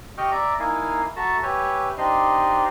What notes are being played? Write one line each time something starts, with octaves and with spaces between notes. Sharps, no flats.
G4 D#5 G5 C#6 F6
D5 E5 A#5 D6
A#3 D#4 E4 F5 G#5
F#4 A4 E5 A5 A#5 C#6
G4 B4 C#5 E5 G#5
C4 D4 D#4 G4 D#5 C6